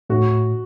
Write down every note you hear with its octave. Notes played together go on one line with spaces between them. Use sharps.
A2 F#4